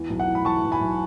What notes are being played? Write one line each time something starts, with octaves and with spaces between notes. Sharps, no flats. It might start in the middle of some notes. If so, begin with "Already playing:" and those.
Already playing: E2 E3
B1
F#5
A2
B5
E3 A5 C#6
B1
G#5 B5
B1